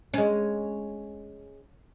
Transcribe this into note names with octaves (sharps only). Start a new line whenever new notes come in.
G#3 C#4